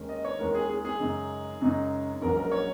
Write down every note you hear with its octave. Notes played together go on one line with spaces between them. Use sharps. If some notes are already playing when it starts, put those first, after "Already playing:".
Already playing: D#2 D#3 G#3 C#4
D#5
C#5
D#2 D#3 G#3 C#4 A#4
G#4
G#4
G#4
F#2 C#3 G#3 D#4
F#2 C#3 G#3 D#4
A#1 G#2 F#3 C#4 A#4
A#4
C#5